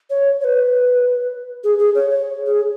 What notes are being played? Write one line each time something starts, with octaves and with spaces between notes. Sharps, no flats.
C#5
C#5
B4
G#4
G#4
C#5
C#5
G#4